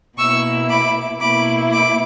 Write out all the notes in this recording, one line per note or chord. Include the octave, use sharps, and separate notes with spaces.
B2 A#3 E4 C#6 E6
B5 D6
B2 A#3 E4 B5 D6
B5 D6